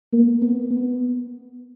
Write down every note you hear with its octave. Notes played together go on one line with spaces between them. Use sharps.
A#3
B3
B3